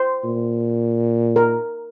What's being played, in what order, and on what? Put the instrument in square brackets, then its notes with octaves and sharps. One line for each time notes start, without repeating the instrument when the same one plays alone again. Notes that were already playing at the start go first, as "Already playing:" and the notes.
Already playing: [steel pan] C5
[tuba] A#2
[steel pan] A#4